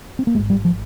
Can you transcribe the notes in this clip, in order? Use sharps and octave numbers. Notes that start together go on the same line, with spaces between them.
C4
A#3
G#1 G#2 G#3
G3
F3